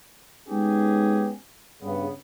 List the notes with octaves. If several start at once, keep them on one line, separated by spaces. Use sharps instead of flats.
G#3 B3 C#4 D#4 G4 G#4
G2 C#3 B3